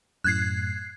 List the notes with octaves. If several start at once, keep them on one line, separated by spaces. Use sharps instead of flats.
F#2 A2 F#6 G#6 C7